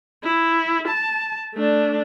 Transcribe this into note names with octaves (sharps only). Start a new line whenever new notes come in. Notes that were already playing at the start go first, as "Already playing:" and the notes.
E4
A5
A3 D4